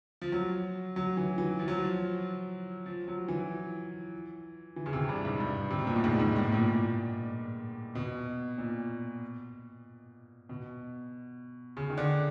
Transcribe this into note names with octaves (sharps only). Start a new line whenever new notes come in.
F3
F#3
F#3
E3
E3
F3
F#3
F3
F3
F#3
E3
E3
C#3
C3
G2
G#2
G2
C3
B2
A#2
A2
G#2
G#2
A2
A#2
B2
A#2
B2
C#3
D#3
D3